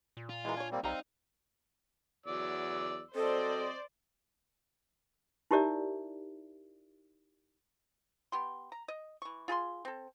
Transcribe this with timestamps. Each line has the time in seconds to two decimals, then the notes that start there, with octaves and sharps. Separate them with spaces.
0.17 A#2
0.30 F4
0.45 E3 G#3 E4 A#4
0.57 D4 C#5 G#5
0.71 G3 A#3 C4
0.84 B1 G3 C4 D#4 F5 A#5
2.26 E2 F#3 D5 E6
3.15 F#3 C4 A4 C5 D5 D#5
5.51 D#4 E4 G4 A#4 D5 E5
8.32 B3 G4 C6
8.72 A#5
8.88 D#5
9.22 E3 C#6
9.48 F4 G#4 B5 C6
9.85 C4 A4